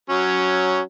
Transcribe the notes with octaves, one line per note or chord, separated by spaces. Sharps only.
F#3 C#4